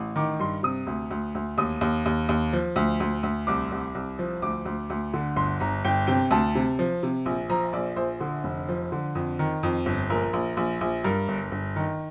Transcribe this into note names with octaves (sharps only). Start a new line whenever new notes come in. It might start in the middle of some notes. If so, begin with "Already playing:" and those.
Already playing: A1
D#3 D6
G2 C6
C3 D#6
D2
D2
D2
D#2 D#6
D#2
D#2
D#2
F3
D2
D2
D2
C2 D6
C2
C2
F3
D2 D6
D2
D2
D3
G1 C6
G1 A#5
G1 G5
C3 G5
D2 A5
C3
F3
C3
A#1
F3 A#5
A#1 D5
A#1 C5
D3
F1
F3
D3
F2
D#3
F2
G1
A#1 A#4
A#1
A#1
A#1
G2 A#4
G1
G1
D#3